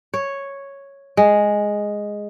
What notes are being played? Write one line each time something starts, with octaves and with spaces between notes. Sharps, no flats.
C#5
G#3